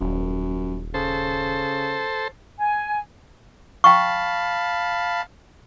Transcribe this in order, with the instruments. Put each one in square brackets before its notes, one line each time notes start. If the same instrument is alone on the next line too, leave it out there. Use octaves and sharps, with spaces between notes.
[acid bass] D#1 [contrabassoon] F#2
[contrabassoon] C#3 [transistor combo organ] A4 C5
[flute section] G#5
[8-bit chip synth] F5 A5 B5 [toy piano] G5 C#6